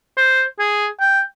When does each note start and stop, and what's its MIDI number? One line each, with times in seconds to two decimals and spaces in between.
0.17 0.43 72
0.59 0.86 68
1.00 1.21 79